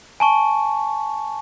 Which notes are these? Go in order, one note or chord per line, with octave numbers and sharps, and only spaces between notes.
G#5 A5 C#6